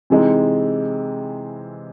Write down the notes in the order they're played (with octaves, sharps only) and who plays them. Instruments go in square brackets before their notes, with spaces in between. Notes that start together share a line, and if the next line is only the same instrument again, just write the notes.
[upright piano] C3 E3 G#3 C4 D#4